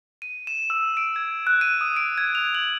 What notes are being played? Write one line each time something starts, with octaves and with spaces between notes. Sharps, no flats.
D#7
E7
E6
D7
G#6
F#6
D#7
D#6
D7
G#6
F7
F#7